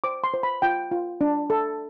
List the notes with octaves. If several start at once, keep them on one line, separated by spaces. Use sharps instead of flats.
C5 D6
C6
C5
B5
F4 G5
F4
D4
A4